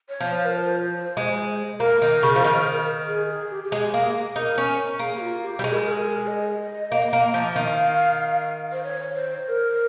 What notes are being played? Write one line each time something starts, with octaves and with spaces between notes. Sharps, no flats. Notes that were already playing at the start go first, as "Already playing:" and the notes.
C#5
F3
C5
A#4
C5
G#3
A#3 A#4
D#3
C#3
F3
D#3
G#4
G#4
G4
G4
G#3 G#4
A#3
D#4 A#4
C#4
A#3 G#4
G4
F4
G4
G3
G#3 G#4
A#4
G#4
A#4
G#4
A#4
G#4
A#4
G#4
D#5
A#3
A#3
F3
D#3 F5
C5
C#5
C5
A#4